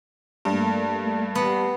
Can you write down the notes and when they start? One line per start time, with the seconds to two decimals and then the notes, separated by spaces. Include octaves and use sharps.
0.45 G2 A3 A#3
1.35 B3 G4 C7